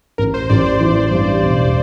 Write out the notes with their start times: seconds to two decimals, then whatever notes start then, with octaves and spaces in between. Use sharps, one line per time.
0.18 A1 A#4
0.34 C5
0.44 C5
0.50 A1 D5
0.65 C5
0.81 E3
1.11 G2
1.42 E1